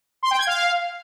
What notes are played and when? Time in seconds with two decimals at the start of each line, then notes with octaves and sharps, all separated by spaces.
0.23 C6
0.31 G5
0.39 G#6
0.47 F5